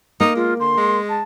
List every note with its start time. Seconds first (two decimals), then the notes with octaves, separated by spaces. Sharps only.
0.20 A#3 D#4
0.36 G#3 F4
0.60 D3 C6
0.77 G#3
1.09 A5